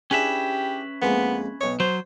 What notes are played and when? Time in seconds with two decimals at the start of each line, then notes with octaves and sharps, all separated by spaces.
0.11 C#4 D4 E4 G4 G#4 B4 E5
1.02 F2 G#3 A#3 B3
1.61 B1 C#5 D#5
1.80 F#3 C5 C#5